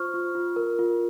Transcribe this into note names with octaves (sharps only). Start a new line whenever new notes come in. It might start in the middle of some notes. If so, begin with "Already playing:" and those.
Already playing: F4 C5 C#6 F6
F4
F4
A#4
F4